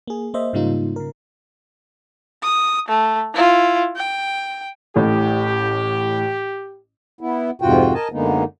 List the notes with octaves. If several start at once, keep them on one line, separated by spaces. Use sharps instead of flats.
A#3 G#4
A#3 C5 D#5 E5
G#2 C#3 G3 A#3 D#4 F4
C#3 A#4
D#6
A3
E4 F4
G5
A1 A2 G4
B3 E4
F2 G#2 C3 F4 F#4 G5
A#4 D#5 G#5 A5
F#2 D3 G#3 A#3 B3 D#4